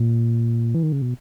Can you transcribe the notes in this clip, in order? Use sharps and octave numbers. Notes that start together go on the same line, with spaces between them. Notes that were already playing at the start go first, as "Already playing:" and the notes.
Already playing: A#2
E3
D#3
C#3
B2